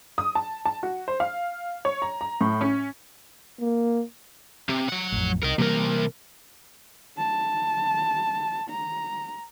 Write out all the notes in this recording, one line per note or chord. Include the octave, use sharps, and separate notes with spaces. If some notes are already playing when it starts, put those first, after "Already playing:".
D#6
A5
A5
F#4
C5
F5
C#5
A#5
A#5
A2
C#4
A#3
C3
F#3 F#5
A1 F2
C2 A#4 D#5
C3 E3 G3 A#3 A#4
A5
A#5